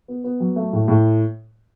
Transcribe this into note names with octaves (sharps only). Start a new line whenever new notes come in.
B3
B3
F#3
A3
A2
A2